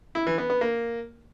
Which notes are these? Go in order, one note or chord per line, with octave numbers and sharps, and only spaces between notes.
E4
E3
B3
B3
A#3